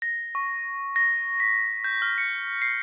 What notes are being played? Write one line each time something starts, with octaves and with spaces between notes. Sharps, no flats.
A#6
C#6
A#6
B6
G6
F6
C#7
C7